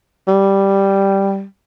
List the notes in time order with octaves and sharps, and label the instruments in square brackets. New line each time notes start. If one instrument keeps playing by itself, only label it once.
[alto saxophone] G3